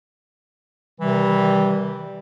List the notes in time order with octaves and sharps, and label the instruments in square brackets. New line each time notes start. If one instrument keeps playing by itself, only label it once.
[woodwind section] C3 D#3 E3 G3